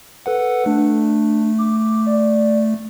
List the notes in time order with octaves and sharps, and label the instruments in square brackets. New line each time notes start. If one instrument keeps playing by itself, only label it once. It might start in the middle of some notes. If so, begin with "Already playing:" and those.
[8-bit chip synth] A4 B4 F#5
[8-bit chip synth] A3 [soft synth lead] D4
[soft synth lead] D6
D5